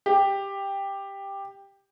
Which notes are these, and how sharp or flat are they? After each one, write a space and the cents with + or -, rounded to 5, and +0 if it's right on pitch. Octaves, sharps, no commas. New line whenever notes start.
G4 +10